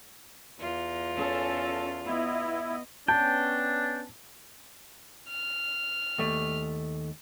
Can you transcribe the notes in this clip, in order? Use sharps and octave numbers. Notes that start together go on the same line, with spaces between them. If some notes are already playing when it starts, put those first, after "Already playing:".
E2 F4
C#4 A4
B3 E4 D#5
B3 C#4 D4 G5 A5
F6
D#2 A3